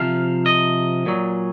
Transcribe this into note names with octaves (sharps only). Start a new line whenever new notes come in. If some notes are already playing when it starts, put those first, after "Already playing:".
Already playing: C3 F3 F5
D#5
A#2 F#3